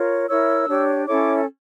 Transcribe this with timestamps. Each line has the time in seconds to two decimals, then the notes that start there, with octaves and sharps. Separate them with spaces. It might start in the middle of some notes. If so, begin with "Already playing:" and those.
Already playing: F4 A#4 C#5
0.29 E4 A#4 C#5 E6
0.68 D4 G4 C#5
1.06 C#4 E4 A4 C#5 D6